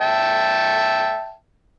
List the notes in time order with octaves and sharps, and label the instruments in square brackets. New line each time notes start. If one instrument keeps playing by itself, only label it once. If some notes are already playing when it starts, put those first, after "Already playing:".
[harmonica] E5 G5 A5